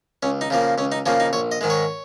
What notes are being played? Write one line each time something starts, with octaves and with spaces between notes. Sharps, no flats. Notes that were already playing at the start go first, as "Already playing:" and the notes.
C#2 C#4
D#4
C#3 F3 A#3
C#2 C#4
D#4
C#3 F3 A#3 C#4
D#4
A#1 C#5
D#5
G#2 D#3 G#3
C#5